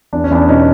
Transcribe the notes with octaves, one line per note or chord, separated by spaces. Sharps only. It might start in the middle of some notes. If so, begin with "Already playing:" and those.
E2 D4
C#4
E2 D4
B2 C#4 D#4